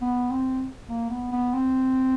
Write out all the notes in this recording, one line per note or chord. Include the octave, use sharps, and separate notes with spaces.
B3
C4
A#3
B3
B3
C4